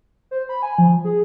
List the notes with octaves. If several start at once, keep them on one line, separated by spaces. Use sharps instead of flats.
C5
B5
G#5
F3
G#4